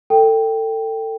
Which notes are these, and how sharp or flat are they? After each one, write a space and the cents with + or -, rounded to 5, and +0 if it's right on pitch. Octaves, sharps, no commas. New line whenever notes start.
A4 +25 G5 +0